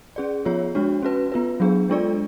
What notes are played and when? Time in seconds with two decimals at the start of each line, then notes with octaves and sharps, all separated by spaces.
0.16 C#4 G#4 D5
0.45 F3 B3 F4 G#4 C#5
0.75 G#3 D4 F#4 C#5
1.02 C#4 F#4 B4
1.32 B3 F4 B4
1.60 F#3 B3 D4 G#4
1.90 G#3 D4 F4 A4 D5